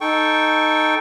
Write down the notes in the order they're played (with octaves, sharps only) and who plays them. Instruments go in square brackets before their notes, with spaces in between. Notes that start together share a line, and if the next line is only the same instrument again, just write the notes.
[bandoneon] D#4 A4 G5 C#6